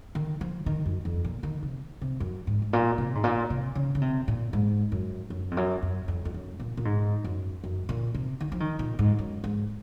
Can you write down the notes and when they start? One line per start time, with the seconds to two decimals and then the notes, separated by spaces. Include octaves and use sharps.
0.15 D#3
0.41 F3
0.66 D#3
0.86 F#2
1.05 F2
1.24 A#2
1.43 D#3
1.63 C3
2.01 C3
2.20 F#2
2.47 G#2
2.62 G#2
2.73 A#2
2.98 C3
3.15 G#2
3.24 A#2
3.50 C3
3.75 C#3
3.95 C#3
4.02 C3
4.28 A#2
4.53 G#2
4.92 F#2
5.30 F#2
5.51 F2
5.57 F#2
5.82 F#2
6.08 F2
6.25 F2
6.34 F#2
6.60 A#2
6.77 A#2
6.85 G#2
7.24 F#2
7.64 F#2
7.89 A#2
8.15 C3
8.40 D#3
8.52 F3
8.60 D#3
8.79 A#2
8.99 G#2
9.18 F#2
9.44 G#2